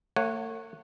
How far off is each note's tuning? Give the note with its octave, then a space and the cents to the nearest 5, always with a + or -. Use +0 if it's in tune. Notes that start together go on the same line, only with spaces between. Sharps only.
A3 +45 C#5 -20 F#5 +0